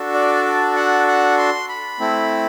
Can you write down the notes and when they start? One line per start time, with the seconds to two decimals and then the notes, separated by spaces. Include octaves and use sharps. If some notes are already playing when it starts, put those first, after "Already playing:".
Already playing: D4 F#4 A4
0.14 D5
0.45 D5
0.76 F#5
1.07 F#5
1.38 C6
1.69 B5
2.00 A3 C4 E4